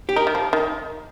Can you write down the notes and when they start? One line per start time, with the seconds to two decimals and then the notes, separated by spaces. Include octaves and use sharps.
0.09 G4
0.16 D#4 A#4
0.27 D#3
0.35 F3
0.53 D#3